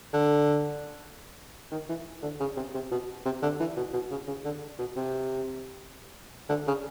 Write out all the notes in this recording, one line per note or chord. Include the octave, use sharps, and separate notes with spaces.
D3
D#3
E3
D3
C#3
C3
C3
B2
C3
D3
E3
B2
B2
C#3
C#3
D3
B2
C3
D3
C#3